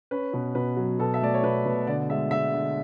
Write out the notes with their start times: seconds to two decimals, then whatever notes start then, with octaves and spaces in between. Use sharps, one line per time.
0.11 C#4 B4
0.33 B2
0.55 B2 B4
0.77 F#3
0.99 B2 A4
1.14 E5
1.21 A3 D5
1.34 C#5
1.43 B2 B4
1.65 B2
1.87 D3 D5
2.09 G#3 E5
2.31 G#3 E5
2.53 D3